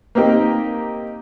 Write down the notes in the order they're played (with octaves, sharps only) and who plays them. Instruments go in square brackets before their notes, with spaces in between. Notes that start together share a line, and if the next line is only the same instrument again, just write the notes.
[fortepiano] A#3 C4 D#4 G4